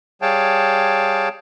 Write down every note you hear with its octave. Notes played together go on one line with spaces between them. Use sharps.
G3 G#4 C#5 F5 G5 A5